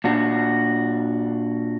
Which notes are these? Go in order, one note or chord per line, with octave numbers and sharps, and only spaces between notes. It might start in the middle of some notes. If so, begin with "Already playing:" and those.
A#2 D4 F#4